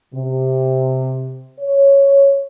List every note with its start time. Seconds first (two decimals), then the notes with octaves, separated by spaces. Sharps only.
0.15 C3
1.59 C#5